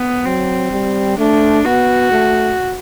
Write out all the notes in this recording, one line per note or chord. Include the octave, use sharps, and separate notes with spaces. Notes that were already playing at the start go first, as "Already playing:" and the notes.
Already playing: B3
F#3 C4
G3
A3 D4
B3 F#4
A3